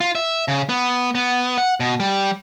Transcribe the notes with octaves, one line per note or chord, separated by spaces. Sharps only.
F4
E5
C#3
B3
B3
F#5
B2
G3